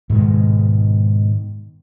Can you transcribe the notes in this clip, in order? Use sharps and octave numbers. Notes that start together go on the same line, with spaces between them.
G#2 B2 D#3 G#3